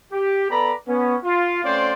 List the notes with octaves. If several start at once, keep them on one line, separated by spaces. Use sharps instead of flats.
G4
B3 A4 B4 D5 A#5 B5
B3 C#4
F4
A3 C4 C#4 F4 C5 D5